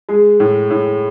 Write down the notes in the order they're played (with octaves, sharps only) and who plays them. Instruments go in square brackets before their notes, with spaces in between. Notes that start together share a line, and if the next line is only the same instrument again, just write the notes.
[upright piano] G#3 G#4
A2
A2